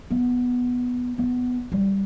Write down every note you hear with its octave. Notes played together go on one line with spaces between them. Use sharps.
B3
B3
G3